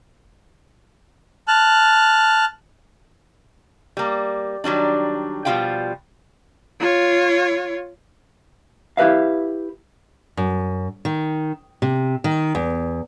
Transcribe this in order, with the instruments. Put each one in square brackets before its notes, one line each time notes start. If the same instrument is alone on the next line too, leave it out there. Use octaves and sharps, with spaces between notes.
[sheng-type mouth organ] A5 F6 F#6
[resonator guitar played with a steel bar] G3 A#3
D#3 F#3 G3 D4
B2 F3 G3 F4 F5 G5
[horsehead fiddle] F4 C#5
[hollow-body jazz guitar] E4 G4 B4 E5 F5
[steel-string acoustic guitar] F#2
D#3
C3
D#3
E2